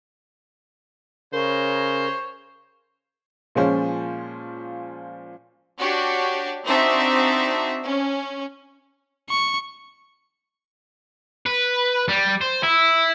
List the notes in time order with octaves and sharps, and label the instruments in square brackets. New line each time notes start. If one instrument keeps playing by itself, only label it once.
[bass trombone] C#3 [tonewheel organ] A#4 [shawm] C5 [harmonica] C#5
[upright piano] A#2 F3 G#3 C#4 C5
[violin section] D4 F#4 G4 C#5
C4 D4 D#4 F#4 E5
C#4
[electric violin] C#6
[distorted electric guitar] B4
G3
C5
E4